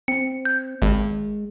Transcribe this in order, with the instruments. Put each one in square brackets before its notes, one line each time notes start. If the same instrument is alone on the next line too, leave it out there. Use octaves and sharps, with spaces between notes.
[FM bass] C4 [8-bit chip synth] C#7
[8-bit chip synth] G6
[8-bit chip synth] G#1 [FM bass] G#3